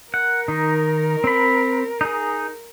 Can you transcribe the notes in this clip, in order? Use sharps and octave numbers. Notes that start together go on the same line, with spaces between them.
A#4 F#5
D#3 D#4
C4 B5
D#4 G#4